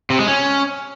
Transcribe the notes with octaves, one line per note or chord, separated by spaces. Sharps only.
C3
G#3
C#4